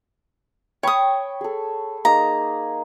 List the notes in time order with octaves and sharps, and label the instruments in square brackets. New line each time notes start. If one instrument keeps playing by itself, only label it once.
[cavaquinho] C#5 D#6 [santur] G5 B5 C#6
[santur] G#4 A4
[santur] A#3 D#4 G#4 [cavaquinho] A#5